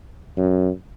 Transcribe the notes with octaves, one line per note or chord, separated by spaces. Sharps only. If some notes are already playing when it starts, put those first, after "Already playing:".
F#2